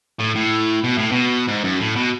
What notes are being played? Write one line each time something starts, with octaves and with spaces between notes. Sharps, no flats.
A2
A2
B2
A2
B2
G#2
F#2
A2
B2